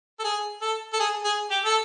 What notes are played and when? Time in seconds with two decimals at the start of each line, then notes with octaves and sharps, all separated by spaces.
0.19 A4
0.24 G#4
0.61 A4
0.93 A4
1.00 G#4
1.24 G#4
1.50 G4
1.65 A4